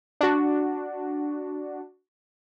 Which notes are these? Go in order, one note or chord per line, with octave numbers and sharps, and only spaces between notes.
D4 F#4